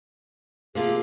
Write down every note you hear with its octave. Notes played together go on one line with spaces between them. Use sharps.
C3 F3 A#3 F4 G#4